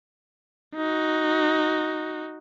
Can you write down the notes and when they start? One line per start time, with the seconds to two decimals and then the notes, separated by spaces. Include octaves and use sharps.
0.76 D#4 F#4